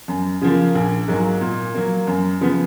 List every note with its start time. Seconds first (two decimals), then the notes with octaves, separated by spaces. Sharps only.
0.08 F#2
0.41 C#3 F3 A#3
0.75 A#1
1.08 G#2 F#3 A#3
1.41 A#2
1.75 F#3 A#3
2.07 F#2
2.41 C#3 F3 B3